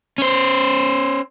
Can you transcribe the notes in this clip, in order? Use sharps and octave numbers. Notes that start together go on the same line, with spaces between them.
C#4 C5